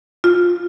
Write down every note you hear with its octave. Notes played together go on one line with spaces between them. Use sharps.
F4